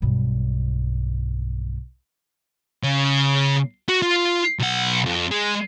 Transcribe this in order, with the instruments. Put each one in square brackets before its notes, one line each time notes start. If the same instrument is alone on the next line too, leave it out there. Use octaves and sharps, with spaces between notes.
[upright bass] B1 G2
[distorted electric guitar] C#3
F#4
F4
B1 F#5
F2
G#3